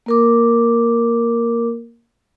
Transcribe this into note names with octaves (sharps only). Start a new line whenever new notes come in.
A#3 A#4 D6